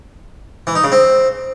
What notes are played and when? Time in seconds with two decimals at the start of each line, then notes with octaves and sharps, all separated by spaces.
0.67 E3
0.75 D#4
0.84 C#3
0.92 C4